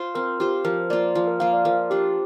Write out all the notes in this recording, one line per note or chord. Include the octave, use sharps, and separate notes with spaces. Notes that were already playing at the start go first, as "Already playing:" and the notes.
Already playing: F4 C5
C4 A#4
F4 G4 C5
F3 A#4
A#3 F4 D5
F3
A#4
A#3 F4 F5
D5
F3 A#4
D4 F4 G4